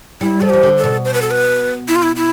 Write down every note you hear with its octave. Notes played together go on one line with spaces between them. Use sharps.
G3 E4
F3 A4
E3 G4
D3
A4
B2
C5
B4
A4
B4
E4
F4
E4
E4